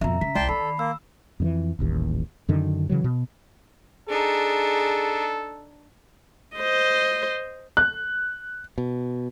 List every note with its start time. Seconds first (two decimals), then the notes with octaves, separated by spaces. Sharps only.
0.01 F2 B2 E5 A#5
0.21 C#3 B6
0.35 C2 D5 G5 A5 C6
0.49 D#3 A4 A5 B5 C7
0.79 A#3 E6
1.40 F2 D#3 E3
1.79 D#1 A1 D#2
2.49 F#2 D3 D#3
2.90 C#3 E3 F#3
3.04 B2
4.09 D4 D#4 G#4 A4
6.56 C5 D#5
7.77 F#6
8.78 B2